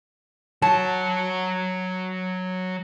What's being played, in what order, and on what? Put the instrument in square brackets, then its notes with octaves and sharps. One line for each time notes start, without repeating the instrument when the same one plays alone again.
[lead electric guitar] F#3 C#5 [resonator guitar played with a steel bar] A5